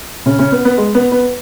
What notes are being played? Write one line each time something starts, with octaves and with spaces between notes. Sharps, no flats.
C#3 C#4
C#3 C#4
B3
B3
G#3
B3
B3 B4